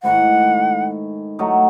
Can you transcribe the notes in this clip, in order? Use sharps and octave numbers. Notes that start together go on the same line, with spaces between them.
G#2 D#3 A3 E4 F#5
F#3 A3 D#4